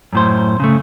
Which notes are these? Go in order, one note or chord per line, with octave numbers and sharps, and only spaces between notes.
F#2 A2 C5
C#3 A3